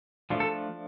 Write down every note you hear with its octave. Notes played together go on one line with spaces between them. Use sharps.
F3 A3 D4
A4